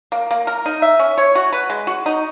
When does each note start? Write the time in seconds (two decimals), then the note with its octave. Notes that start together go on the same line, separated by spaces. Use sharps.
0.12 A#3
0.31 A#3
0.47 A#4
0.66 D#4
0.82 E5
0.99 C#4
1.18 C#5
1.35 F#4
1.52 B4
1.70 G#3
1.87 F#4
2.06 D#4